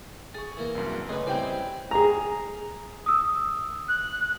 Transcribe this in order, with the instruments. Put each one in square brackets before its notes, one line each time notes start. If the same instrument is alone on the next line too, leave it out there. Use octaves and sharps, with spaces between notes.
[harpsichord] G#4 [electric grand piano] C#6 A6
[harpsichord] E3 A#3 A#5
[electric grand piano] C2 F#2
[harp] A2 C#3 F#6 [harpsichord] G#4 B4 [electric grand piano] D#5 C6
[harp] G3 G5 G6 [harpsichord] C4 D5 [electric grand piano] E4 C5 D#5
[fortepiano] G#4 A#5
[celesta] D#6 E6
[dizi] F#6